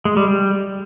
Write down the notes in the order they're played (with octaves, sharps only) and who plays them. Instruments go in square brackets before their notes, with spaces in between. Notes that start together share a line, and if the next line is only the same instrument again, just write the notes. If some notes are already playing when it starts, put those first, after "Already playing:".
[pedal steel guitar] G#3
G3
G3